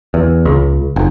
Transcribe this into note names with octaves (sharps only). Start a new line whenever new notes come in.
E2
C#2
F1